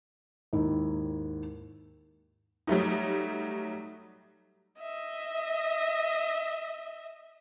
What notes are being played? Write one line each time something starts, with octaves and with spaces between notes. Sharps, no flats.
D#2 G#2 D#3 E4
F#3 G3 A3 D#4
D#5 E5